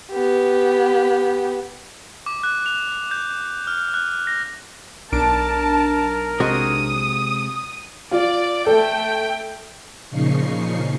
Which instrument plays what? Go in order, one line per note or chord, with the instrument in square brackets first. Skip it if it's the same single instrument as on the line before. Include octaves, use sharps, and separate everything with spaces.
[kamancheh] B3 G4
[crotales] D6
F#6
F7
G6
F6
F#6
A#6
[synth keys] B1 D4 D7 [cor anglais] A#4 [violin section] A5
[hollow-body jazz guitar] C3 G#3 F#4 [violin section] D#6
[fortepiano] F4 [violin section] D5
[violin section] A3 G5 [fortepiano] A4
[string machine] A#2 C#3 F3 D#4 C#6 C7